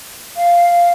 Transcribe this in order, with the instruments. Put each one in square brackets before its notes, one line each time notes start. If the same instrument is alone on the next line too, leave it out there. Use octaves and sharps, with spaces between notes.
[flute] F5